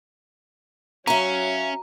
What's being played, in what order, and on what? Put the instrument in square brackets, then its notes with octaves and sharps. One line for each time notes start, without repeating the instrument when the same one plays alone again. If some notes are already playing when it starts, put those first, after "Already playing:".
[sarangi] F#3 [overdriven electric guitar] C#4 [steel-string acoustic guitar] E5 F5 [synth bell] A#5